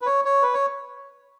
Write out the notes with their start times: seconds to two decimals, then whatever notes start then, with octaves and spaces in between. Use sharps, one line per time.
0.02 B4
0.06 C#5
0.25 C#5
0.42 B4
0.54 C#5